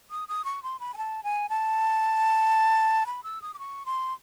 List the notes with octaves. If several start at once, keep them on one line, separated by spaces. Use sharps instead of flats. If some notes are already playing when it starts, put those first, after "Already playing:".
D#6
D#6
C#6
C6
B5
G#5
A5
G#5
A5
B5
E6
D#6
D6
C#6
C6